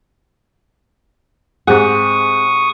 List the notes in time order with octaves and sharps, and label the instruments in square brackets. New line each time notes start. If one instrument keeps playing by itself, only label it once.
[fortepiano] G#2 G4 F#5 [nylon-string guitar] C4 G#4 [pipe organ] C#6 D#6